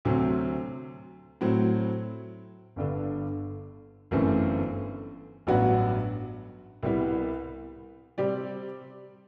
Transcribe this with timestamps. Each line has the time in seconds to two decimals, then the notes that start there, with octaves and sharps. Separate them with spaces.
0.05 D2 C3 F#3 C4
1.41 A2 F#3 C4
2.76 G1 G2 D3
4.11 G1 F#2 E3 A3 C4
5.47 A1 G2 F#3 B3 F#4
6.83 C2 B2 G3 B3 E4
8.18 C3 G3 C4 G4 D5